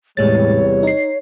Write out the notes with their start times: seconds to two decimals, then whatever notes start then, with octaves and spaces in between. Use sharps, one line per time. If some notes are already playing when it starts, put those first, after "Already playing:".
0.17 E2 A2 C3 G3 G#3 C#5 A6
0.83 D#4 C7